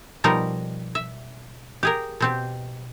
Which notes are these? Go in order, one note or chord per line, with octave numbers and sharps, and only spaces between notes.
B2 F3 G3 D#4 A#4
E5
G4 G#4 A#4
B2 C4 G4